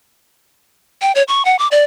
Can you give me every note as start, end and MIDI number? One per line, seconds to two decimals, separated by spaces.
1.02 1.12 79
1.15 1.23 73
1.28 1.45 85
1.45 1.56 78
1.59 1.68 86
1.71 1.85 74